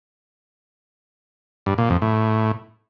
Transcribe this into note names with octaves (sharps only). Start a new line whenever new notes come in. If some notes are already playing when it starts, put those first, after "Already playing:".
G2
A#2
F2
A2